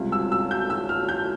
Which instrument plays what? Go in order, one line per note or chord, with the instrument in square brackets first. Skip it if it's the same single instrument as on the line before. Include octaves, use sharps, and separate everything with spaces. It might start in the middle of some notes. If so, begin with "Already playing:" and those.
Already playing: [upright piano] C#2 C3 G3
E6
E6
G6
E6
F6
G6